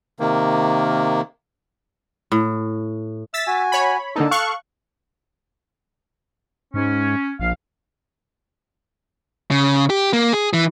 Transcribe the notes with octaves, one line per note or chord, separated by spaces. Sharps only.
C3 D#3 A#3
A2
E5 E6 A6 B6
F#4 G#5
C#5 B5
D3 A#3 D#4 A4 A5
F5 C#6 F#6
G#2 C#4
A#1 F5
C#3
G4
A#3
G#4
E3